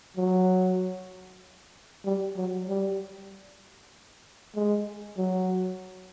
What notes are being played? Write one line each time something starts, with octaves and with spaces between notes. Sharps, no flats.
F#3
G3
F#3
G3
G#3
F#3